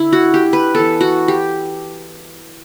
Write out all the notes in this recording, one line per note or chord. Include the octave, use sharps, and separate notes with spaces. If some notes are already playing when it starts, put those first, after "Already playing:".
Already playing: D3 E4
F#4
G4
B4
E3 B3 A4
F#4
G4